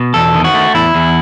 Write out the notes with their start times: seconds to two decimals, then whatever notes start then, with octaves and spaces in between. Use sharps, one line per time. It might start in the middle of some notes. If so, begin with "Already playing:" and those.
Already playing: B2
0.14 E2 A4
0.35 D#3
0.44 F#4
0.54 A3
0.75 E2 E4
0.94 E2